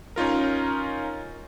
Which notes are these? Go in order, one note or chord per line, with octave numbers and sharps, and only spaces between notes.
C#4 D#4 F4 A#4